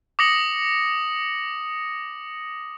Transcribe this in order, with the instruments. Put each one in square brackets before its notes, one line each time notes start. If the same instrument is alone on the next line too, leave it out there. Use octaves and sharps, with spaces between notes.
[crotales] D6 D#6 A#6 C#7 F#7